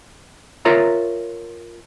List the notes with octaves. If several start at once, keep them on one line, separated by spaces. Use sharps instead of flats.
F4 A#4 C#5 E5 A#5